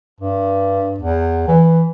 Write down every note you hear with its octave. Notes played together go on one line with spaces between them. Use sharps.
G2
E2
E3